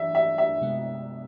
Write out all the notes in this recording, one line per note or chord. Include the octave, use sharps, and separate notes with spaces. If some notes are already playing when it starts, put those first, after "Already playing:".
Already playing: E3 E5
E5
E5
C3 G#3 B3